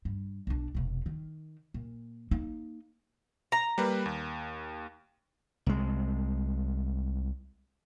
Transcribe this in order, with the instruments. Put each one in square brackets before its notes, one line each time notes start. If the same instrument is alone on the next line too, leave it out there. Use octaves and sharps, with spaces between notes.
[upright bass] G2
B1 D4
F1 B2
D#3
A#2
A#3 D#4
[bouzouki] A#5
[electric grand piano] G3 A#3 B4
D#2
[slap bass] C2 G#3